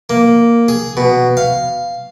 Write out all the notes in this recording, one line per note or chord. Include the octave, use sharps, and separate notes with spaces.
A#3
G#4
B2
F5